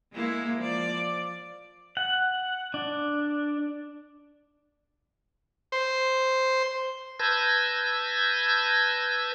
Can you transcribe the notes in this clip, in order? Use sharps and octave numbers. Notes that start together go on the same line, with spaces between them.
G#3 A#3 E4
F3 D5
F#5
D4
C5
B4 A5 E6 G6 G#6 A#6